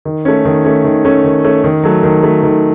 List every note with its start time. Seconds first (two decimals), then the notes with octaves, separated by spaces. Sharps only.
0.05 D#3
0.25 A3 C#4
0.45 D#3
0.65 A3 C#4
0.85 D#3
1.05 A3 C#4
1.24 D#3
1.44 A3 C#4
1.64 D#3
1.84 F#3 A3
2.03 D#3
2.23 F#3 A3
2.43 D#3